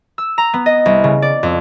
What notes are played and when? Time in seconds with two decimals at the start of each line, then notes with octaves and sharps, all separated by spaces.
0.18 E6
0.38 A#5
0.54 B3
0.66 D#5
0.86 C2
1.04 C#3
1.22 D5
1.43 F2